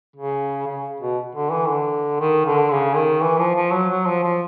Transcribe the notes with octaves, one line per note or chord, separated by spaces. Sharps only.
C#3
C#3
B2
D3
E3
D3
D#3
D3
C#3
D#3
E3
F3
F3
F#3
F#3
F3
F3